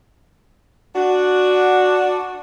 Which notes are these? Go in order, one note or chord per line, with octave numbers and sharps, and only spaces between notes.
D4 F#4